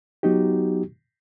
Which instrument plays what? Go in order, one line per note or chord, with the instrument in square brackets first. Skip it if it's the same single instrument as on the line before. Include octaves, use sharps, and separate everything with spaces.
[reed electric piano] F#3 B3 D#4 F#4 G4